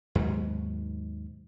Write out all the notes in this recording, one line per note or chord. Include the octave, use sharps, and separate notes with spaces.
D#2 G#2 B2 F#3